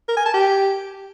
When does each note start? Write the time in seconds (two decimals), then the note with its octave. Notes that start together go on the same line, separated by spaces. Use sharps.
0.08 A#4
0.17 G#5
0.26 A5
0.34 G4